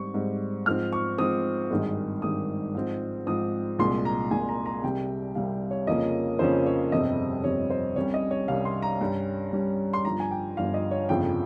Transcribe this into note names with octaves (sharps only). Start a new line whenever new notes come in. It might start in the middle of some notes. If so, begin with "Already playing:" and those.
Already playing: G#2 G3 C4 C#6
G#2 G3 C4
G#2 F3 C4 F6
C#6
G#2 F3 C4 D#6
G#1 G2 D#3 G#3
G#1 G2 D#3 G#3 D#6
G#2 F3 C4
G#2 F3 C4 D#6
C2 A#2 G#3 C6
A#5
C2 A#2 G#3 G#5
A#5
A#5
C2 C3 G3 G5
C2 C3 G3 F5
C#5
F2 C#3 F3 A#3 C#4 D#5
F2 C#3 F3 A#3 C#4 C5
C#5
G1 F2 C3 G3 C4 D#5
G1 F2 C3 G3 C4 C#5
C5
C2 C3 G3 C#4 C#5
D#5
C#5
C2 C3 G3 C#4 F5
C6
A#5
G2 G3 C#4
G2 G3 C#4
C6
G1 G2 F3 A#5
G#5
G5
G1 G2 F3 F5
D#5
C#5
G1 F2 C#3 F3 G5